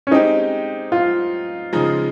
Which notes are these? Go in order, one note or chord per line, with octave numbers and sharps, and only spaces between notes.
C#4
G#3 C4 D#4 G4
F4
C#3 F3 G#3 D#4